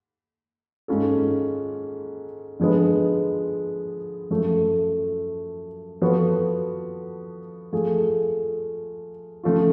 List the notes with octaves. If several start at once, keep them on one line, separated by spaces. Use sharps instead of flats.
G#2 G#3 C#4 F4 A4
D3 F3 G#3 B3
F#2 F3 A3
F3 B3 F#4 A4
F3 A3 F4 G#4
C#3 F3 A3 F4